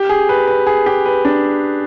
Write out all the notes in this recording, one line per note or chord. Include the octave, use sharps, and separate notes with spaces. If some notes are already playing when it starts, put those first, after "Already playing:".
Already playing: G4
G#4
B4
B4
G#4
G4
B4
D4